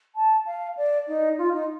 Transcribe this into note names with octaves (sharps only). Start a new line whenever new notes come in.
A5
F5
D5
D#4
F4
D#4